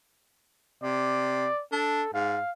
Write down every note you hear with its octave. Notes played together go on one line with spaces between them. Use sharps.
C3 D5
D4 A4
G#2 F5